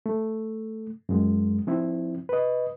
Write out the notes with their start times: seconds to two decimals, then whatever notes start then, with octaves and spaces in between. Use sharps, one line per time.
0.06 A3
1.09 F#2 G#3
1.67 F3 C4 E4
2.29 B4 D#5